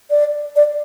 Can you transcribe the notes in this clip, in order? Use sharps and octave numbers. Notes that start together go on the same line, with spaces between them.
D5
D5